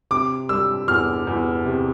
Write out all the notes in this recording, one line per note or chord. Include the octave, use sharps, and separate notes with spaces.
C3 D6
G3 E6
E2 F6
E2
C3